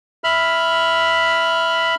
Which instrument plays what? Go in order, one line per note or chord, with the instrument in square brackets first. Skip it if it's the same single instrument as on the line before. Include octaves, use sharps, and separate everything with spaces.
[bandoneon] E5 B5 F6